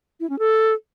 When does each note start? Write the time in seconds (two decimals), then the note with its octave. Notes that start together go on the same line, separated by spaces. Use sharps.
0.20 E4
0.30 C#4
0.39 A4